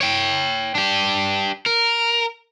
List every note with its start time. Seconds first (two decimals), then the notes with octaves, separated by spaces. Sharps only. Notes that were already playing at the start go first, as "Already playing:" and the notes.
0.01 C#5 G5
0.75 D4 G4
1.66 A#4